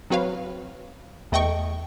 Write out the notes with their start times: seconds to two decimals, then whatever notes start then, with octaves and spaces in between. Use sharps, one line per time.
0.10 F#3 C4 F#4 B4 C#5 F5
1.32 E2 A3 D#5 G5 C#6